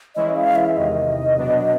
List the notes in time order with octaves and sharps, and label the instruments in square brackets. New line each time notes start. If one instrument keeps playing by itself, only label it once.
[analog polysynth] E3 G#3 C#4 E4 [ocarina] D#5
[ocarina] F5
E5
[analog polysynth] E2 C3 D#3 [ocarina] D#5
[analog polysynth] B2 F#3 B3 D4